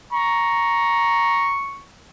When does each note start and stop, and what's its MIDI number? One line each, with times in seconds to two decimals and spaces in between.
0.13 1.58 82
0.13 1.82 85